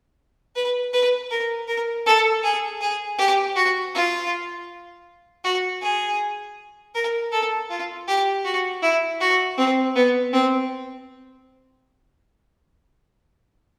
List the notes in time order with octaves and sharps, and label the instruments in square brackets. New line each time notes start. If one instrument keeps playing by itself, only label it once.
[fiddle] B4
B4
A#4
A#4
A4
G#4
G#4
G4
F#4
F4
F#4
G#4
A#4
A4
F4
G4
F#4
E4
F#4
C4
B3
C4